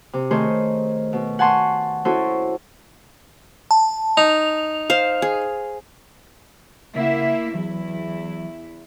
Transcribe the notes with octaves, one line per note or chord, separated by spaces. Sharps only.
C3
D#3 A3 G#4 C5 C#5
B2
F#5 G#5 A5 C6 C#6
C#4 E4 F#4 A4 C5
A5
D#4 F7
C5 F5
G#4
C#3 A#3 E4 E5 F#5
E2 E3 F#3 E4